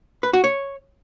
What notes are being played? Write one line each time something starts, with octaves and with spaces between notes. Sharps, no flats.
B4
F#4
C#5